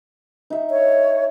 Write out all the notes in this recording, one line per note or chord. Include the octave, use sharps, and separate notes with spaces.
D#4 E5
C#5